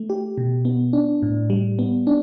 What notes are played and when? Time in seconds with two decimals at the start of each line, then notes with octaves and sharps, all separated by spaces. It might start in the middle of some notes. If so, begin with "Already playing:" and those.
Already playing: A3
0.10 G4
0.38 B2
0.65 B3
0.93 D4
1.22 A2
1.50 G3
1.79 B3
2.07 D4